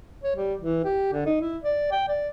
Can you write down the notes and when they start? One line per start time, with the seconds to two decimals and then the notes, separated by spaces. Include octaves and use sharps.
0.23 C#5
0.36 G3
0.59 E3
0.84 G4
1.13 D3
1.26 D#4
1.41 E4
1.63 D5
1.91 G5
2.08 D5